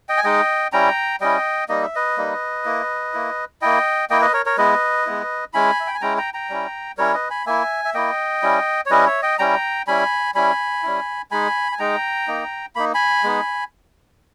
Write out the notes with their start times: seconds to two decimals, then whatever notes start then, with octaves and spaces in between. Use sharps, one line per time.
0.09 D#5 G5
0.17 G#5
0.24 G#3 D#4 D#5 G5
0.73 G3 C#4 E4 G5 A#5
1.21 G3 C#4 E4 D#5 G5
1.69 G3 A#3 D#4 D#5
1.82 E5
1.95 B4 D#5
2.17 G3 A#3 D#4
2.65 A#3 E4
3.14 A#3 E4
3.62 A#3 E4 D#5 G5
4.10 A#3 E4 D#5 G5
4.21 B4 D#5
4.33 A#4 C#5
4.46 A#4 C#5
4.58 G#3 B3 E4 B4 D#5
5.06 G#3 B3 E4
5.53 G#3 C#4 E4 G#5 B5
5.80 E5
5.87 G5
5.94 G#5
6.01 G#3 C#4 E4 G5 A#5
6.17 G5 A#5
6.34 G5 A#5
6.50 G3 C#4 E4
6.98 G3 C#4 E4 A#4 C#5
7.14 B4 D#5
7.30 G#5 B5
7.46 A#3 E4 E5 G#5
7.85 E5
7.94 A#3 E4 D#5 G5
8.43 G3 C#4 E4
8.86 C#5
8.90 G3 C#4 E4 B4 D#5
9.06 C#5 E5
9.22 D#5 G5
9.39 G3 C#4 E4 G5 A#5
9.87 G3 C#4 E4 G#5 B5
10.35 G3 C#4 E4 G#5 B5
10.83 G3 C#4 E4
11.31 G#3 D#4 G#5 B5
11.72 G#5
11.79 G#3 D#4 G5 A#5
12.28 A#3 D#4
12.75 A#3 D#4 B5
12.94 G#5 B5
13.23 G#3 B3 D#4